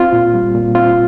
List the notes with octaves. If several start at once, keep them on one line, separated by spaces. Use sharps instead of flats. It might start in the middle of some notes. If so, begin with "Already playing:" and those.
Already playing: C4 F4
A#2
G3
A#2
C4 F4